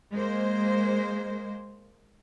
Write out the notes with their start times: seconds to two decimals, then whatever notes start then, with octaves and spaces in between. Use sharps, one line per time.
0.11 G#3 A#3 C5